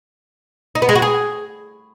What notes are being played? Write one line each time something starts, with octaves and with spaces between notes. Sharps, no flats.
D#4
B3
G#3
F#4
G#4